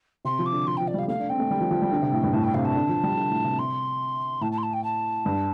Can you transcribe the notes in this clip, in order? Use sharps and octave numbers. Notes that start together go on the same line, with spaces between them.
C3 C6
F3
D6
D3
F3 C6
F3 G5
D5
G3 F5
A3 F5
D4
C4 G5
A3
G3
F3
F3
G3
D3
C3
A2
G2
A2 A5
G5
C3 F5
A5
D3
F3
G3
D3
A2
C3
C6
A2 A5
A5
C6
A5
G5
A5
G2